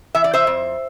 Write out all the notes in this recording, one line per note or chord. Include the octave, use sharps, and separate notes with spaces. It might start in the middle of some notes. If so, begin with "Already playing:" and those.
E3 E5
D5
C5 E5
F2